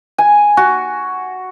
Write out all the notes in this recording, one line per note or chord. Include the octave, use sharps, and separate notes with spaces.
G#5
F#4